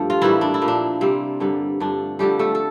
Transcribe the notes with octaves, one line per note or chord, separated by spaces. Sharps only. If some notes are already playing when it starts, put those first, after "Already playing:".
Already playing: G2 F3 A3 G4
F4
A2 E3 G3 A#3 E4
D4
E4
A#2 F3 A#3
D4
C3 G3 A#3 C4
G2 D3 G3 A#3
G2 F3 A3 D4
D3 F3 G3 A3 G4
A3 A4
A4